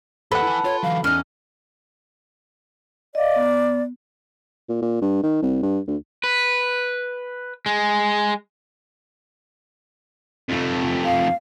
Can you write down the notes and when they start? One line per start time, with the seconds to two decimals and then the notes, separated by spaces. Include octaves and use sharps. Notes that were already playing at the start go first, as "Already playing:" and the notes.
0.32 G4 A4 B4 D#5 F#5
0.43 E4 G#5
0.64 F4 C#5
0.83 E3 F#3 F5
1.04 E2 C#4 D#4 F6
3.15 D5 D#5 F5
3.36 B3
4.69 A#2
4.82 A#2
5.01 G2
5.23 D#3
5.42 C2
5.62 G2
5.87 D2
6.24 B4
7.66 G#3
10.49 F2 A3
11.05 F5